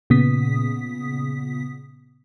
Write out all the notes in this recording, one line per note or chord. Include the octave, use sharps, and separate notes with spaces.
A#2 C#3 B3 D#6 B6